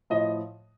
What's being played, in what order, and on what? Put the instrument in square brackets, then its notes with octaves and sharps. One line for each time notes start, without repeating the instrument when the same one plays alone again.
[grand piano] A2 F3 D#5